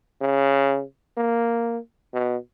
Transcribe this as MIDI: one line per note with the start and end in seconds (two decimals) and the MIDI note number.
0.21 0.83 49
1.18 1.78 58
2.14 2.37 47